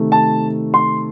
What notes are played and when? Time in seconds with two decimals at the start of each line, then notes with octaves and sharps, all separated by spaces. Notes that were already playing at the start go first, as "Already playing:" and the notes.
Already playing: C3 D#3 A3
0.12 A5
0.74 C6